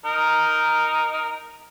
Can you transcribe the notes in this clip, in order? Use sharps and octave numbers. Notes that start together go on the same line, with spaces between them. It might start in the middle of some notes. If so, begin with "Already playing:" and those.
D#4 A#4